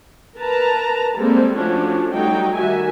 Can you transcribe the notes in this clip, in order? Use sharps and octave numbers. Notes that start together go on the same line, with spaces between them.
A#4 B4 A5 A#5
G3 G#3 A#3 C4 A4
F3 A3 C#4 D4 F#4
F#3 G3 A3 D#4 F#4 G5
D#3 G3 F#4 E5 G#5